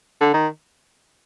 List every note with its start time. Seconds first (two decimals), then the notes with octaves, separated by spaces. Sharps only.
0.21 D3
0.34 D#3